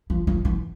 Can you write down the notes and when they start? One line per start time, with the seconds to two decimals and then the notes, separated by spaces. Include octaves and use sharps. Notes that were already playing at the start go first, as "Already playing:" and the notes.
0.10 F3
0.27 F3
0.45 E3